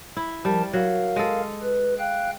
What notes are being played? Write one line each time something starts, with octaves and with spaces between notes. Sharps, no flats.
E4
F3 G3 A#4 A5
F#3 A#4 F5
G#3 A4
B4
F5 G5 F#6